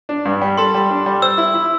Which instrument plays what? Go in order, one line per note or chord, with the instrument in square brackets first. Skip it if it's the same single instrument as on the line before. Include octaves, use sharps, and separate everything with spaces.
[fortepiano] D4
G2
G3
[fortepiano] A4 [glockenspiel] C6
[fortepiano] G3
D4
G3
[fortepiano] C5 [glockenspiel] E6
[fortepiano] E4
E4